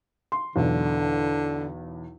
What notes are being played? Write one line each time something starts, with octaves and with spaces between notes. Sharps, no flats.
C6
B1 E2 D3